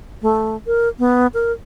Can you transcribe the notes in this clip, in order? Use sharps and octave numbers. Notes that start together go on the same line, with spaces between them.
A3
A#4
B3
A#4